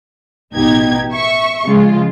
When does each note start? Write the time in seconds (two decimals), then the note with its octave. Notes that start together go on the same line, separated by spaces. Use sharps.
0.53 A1 B2 D#4 G4 G#6
1.12 E5 C#6
1.64 C#3 F3 G#3 F4